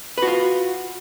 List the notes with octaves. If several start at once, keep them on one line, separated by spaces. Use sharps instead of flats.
F4 F#4 B4